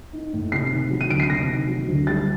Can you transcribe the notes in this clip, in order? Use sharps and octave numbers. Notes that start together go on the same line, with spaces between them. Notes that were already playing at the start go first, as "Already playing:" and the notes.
D#4
A2
C3 C7
D#3
F#3
D#7
D2 D7
C7
C3 A#6
D#3
F#3
D2
G3 A6